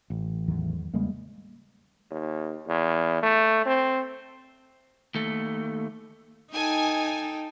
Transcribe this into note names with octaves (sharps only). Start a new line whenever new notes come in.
A1
E2 D#3 F#3
E2 C#3 G3 G#3 A#3 C#4
D#2
E2
A3
C4
D#2 A3
D#4 A4 G5 G#5